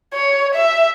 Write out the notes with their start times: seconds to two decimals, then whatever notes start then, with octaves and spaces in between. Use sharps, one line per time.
0.14 C#5
0.55 E5